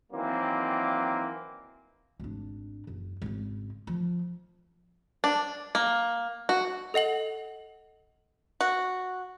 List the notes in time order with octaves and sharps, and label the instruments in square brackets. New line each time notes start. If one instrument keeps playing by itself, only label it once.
[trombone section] D#3 E3 F#3 A#3 C4
[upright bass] G#1 D4
F#1
G#1 C#3
F3
[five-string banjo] D4
A#3
F#4
[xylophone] A4 D#5 F#5 F#7
[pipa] F#4